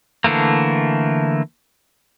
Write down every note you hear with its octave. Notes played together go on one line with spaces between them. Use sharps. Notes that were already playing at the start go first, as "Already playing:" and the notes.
D3 E3 A3 A#3